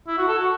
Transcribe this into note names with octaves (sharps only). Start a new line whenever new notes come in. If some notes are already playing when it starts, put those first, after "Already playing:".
E4
F#4
A4
F#4